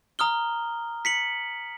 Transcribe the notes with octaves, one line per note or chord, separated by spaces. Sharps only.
A#5 D#6 F6 G7
B6 C#7 F#7